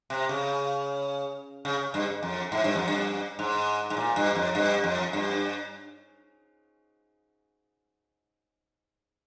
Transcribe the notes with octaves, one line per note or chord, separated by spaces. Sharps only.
C3
C#3
C#3
G2
F2
G#2
G2
F2
G2
G#2
G#2
A#2
G2
F2
G2
F2
G2